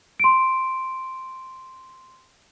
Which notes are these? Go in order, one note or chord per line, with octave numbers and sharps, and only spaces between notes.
C6 D7